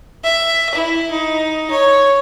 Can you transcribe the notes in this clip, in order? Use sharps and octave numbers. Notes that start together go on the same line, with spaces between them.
E5
E4
D#4
C#5